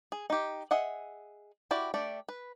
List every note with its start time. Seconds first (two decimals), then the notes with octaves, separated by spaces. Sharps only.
0.12 G#4
0.30 D#4 G4
0.71 G#4 D#5 E5 F#5
1.71 E4 F#4 G4 D5
1.94 A3 D4 G4 D5
2.29 B4